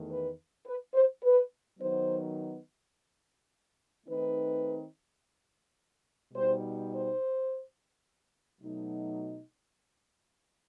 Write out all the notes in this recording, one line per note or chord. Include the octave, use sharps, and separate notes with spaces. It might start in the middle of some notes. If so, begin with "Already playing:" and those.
Already playing: E2 D#3 A3 D#4
B4
B4
C5
B4
D#3 F#3 B3 D#4 C5
D#3 A3 C4 D#4 B4
B2 G3 D#4 C5
C5
B2 F#3 A3 D#4